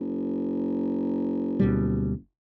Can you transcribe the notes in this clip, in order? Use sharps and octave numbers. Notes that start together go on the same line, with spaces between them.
F#1
D2 B2 G3